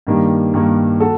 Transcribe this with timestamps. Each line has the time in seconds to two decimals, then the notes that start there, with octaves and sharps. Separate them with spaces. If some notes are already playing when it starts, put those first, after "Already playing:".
0.07 G2 D#3 G3 A#3
0.54 G2 D#3 G3 A#3
1.00 F#4 A4